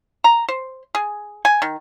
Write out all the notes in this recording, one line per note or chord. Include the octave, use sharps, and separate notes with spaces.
A#5
C5
G#4
G#5
D#3